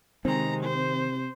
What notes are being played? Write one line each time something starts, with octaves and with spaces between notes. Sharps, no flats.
C3 D#3 G#3 C4 A#5
C5